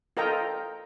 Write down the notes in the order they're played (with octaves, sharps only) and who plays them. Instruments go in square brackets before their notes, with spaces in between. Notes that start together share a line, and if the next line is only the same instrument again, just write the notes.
[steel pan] F4 A4 A#4 D#5 G5 A#5